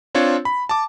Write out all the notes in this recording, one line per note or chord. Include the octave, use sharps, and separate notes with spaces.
C4 D4 F4 C#5
B5
A5 D6